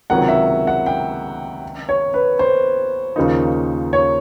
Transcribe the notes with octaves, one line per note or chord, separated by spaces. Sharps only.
C#2 C3 D#3 F#3 F#5
E5
F#5
G5
C#5
B4
C5
D#2 C#3 F3 A#3 D#4
C#5